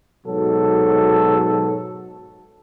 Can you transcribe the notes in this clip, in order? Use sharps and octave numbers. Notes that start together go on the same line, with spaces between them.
G#2 B2 F#3 A4